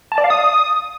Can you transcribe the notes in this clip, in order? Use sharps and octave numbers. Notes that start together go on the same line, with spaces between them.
A5
D5
F5
D#6